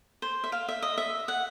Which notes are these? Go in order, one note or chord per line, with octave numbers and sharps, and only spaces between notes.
C5
E5
F5
E5
D#5
E5
F#5